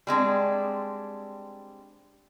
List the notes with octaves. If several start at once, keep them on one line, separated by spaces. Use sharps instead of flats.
G3 G#3 C4 D4